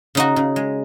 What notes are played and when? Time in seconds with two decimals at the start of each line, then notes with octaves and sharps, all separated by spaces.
0.15 C#3 D#4 F#4
0.36 C#3
0.56 G#3